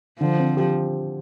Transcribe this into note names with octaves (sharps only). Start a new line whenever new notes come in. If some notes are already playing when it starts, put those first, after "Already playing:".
D3 F3
C4
G4